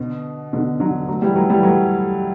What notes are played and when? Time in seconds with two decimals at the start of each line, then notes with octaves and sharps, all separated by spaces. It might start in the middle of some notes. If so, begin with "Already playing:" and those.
Already playing: B2 D3
0.53 B2 D3
0.80 D3 F#3
1.08 F#3 A3
1.22 E3 G3
1.36 F#3 A3
1.49 E3 G3
1.63 F#3 A3